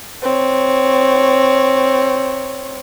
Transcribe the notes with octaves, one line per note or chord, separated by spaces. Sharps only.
C4 C#5